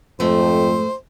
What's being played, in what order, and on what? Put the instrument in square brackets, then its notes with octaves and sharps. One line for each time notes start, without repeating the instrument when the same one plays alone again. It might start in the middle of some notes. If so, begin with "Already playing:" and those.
[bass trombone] F2 [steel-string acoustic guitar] G#2 F3 A3 [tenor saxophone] C5